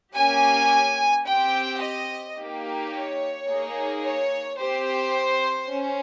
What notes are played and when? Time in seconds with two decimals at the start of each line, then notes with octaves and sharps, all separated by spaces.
0.15 A#3 C#4 G4 G#5
1.25 C4 G4 G5
1.82 D#5
2.37 A#3 D#4 G4
2.93 C#5
3.48 A#3 D#4 G#4
4.04 C#5
4.60 C4 G4 C5
5.71 C#4